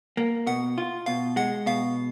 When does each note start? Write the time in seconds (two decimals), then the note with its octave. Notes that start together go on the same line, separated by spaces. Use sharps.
0.17 A#3
0.47 B2 F#5
0.78 F4
1.06 B2 F5
1.36 G#3 F#5
1.66 B2 F5